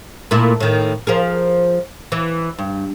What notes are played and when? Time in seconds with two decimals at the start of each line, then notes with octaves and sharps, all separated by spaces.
0.31 A#2 A3 E4
0.60 A2 D#3
1.07 F3 G#4 A#4
2.12 E3
2.59 G2